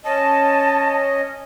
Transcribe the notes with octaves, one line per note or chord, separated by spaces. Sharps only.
C#4 D#5 A5